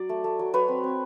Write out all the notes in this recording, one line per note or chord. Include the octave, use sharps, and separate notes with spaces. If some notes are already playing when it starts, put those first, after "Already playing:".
Already playing: F#3 D5
A3
A3
F#3
F#3 B4 C#5
C4
C4